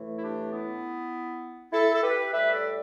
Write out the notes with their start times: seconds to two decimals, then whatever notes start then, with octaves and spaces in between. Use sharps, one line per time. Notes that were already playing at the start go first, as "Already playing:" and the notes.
Already playing: A2 E3 A3
0.18 E4
0.22 D4 G4
0.52 B3 E4
1.73 E4 A4
1.94 A4
2.03 G4 B4
2.33 A2 G3 B4 E5
2.53 A4 D5